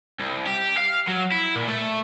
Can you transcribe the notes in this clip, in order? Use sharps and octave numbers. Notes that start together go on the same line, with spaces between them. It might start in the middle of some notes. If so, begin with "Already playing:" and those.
C2
G4
F5
F#3
E4
A#2
A3